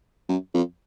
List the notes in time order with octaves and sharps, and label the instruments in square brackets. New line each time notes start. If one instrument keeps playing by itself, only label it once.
[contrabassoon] F#2
F2